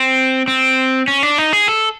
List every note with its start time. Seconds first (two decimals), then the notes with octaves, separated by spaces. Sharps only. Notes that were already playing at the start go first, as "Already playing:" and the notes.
Already playing: C4
0.48 C4
1.08 C#4
1.23 D4
1.38 D#4
1.53 G#4
1.68 A4